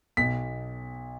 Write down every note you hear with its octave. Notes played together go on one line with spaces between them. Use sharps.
B1 B2 B6